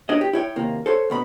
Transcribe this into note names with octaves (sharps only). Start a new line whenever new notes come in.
D4 C#5 D#5
G4
E4 C#5 G5
D#2 C3 A#3
A4 C5 C#5
D2 B2 B5